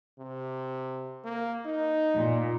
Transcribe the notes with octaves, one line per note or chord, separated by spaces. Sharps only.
C3
A#3
D#4
A#2